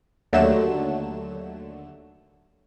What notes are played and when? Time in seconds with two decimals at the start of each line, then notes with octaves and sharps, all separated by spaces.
0.33 D#2 D3 F#3 A3 E7